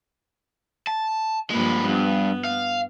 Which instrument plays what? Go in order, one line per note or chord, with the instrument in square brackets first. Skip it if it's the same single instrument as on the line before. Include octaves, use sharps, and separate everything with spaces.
[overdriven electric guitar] A5
[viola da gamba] G2 F3 A#3 [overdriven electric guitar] G#3 B4
[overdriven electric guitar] G2 [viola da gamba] B3
[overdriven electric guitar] F5